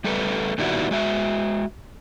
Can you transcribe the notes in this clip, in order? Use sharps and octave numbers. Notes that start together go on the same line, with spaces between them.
G3 A3 A4 B4
A#2 D#3 G3 B3 E4 F#4
G#3 F#4 E5